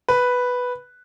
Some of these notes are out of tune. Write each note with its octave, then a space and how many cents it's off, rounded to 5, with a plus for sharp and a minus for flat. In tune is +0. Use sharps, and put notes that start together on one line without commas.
B4 +0